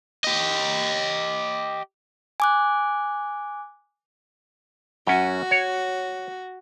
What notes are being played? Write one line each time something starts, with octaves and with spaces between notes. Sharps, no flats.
G4 D#5
G#5 D6 F#6
F#2 C#4 F#4
C#5